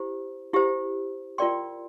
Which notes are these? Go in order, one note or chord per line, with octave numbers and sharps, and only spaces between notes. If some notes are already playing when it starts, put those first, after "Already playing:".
Already playing: E4 G4 C5
E4 G4 C5
F4 A#4 D5 G5 C6